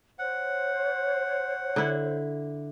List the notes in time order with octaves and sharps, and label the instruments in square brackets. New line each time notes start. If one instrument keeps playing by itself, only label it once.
[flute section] C5 C#5 [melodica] F#5
[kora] D3 E4